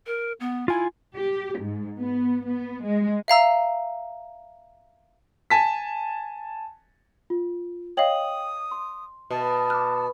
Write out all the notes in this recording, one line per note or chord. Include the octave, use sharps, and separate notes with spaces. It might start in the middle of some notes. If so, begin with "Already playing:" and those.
A#4
B3
E4 F4 G#5
G4
G#2
B3
B3
G#3
E5 F5 A#5 E6
G#5 A5 B6
F4
C#5 D#5 F5 G5 D#6 F#7
C6
B2 A5
D6 F6 F#6